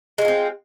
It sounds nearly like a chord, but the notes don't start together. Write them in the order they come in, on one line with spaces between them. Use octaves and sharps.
G#3 F4 A#3 C4